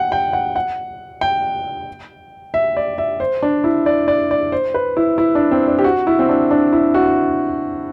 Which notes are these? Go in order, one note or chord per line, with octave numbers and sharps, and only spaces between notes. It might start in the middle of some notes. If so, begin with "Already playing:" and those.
Already playing: F#5 G5
G5
F#5
F#5
G5
E5
D5
E5
C5
D4
E4
D5
D5
D5
C5
B4
E4
E4
D4
C4
D4
G4
F#4
E4
C4
D4
D4
E4
F#4